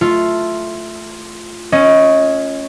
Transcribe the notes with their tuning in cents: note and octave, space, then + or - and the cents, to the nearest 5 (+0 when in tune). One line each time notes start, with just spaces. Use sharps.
A3 +0 F4 +0
C#4 -5 D#5 +25